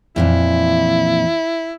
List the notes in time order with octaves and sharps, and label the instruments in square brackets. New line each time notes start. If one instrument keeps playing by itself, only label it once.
[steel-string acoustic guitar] F2 A#2 E3 [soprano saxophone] E4